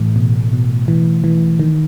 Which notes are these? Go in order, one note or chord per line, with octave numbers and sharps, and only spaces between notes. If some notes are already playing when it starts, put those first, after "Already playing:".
Already playing: A2 E3 A3
B2
B2
E3
E3
D#3